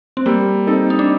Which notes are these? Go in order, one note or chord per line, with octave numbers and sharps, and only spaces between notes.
C4
G3 A#3
C4 D#4 A4
D#4
D4